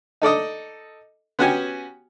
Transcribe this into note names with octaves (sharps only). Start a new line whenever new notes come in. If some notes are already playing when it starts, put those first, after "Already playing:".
D#4 A4 D5 D#5
B3 C#4 F#4 G4 G#5